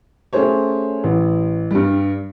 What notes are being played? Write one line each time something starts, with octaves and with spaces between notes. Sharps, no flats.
A3 C#4 G4 G#4 C5 C#5
A1
G2 G3